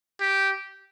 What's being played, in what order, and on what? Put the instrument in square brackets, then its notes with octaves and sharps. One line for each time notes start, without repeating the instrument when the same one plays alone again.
[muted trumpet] G4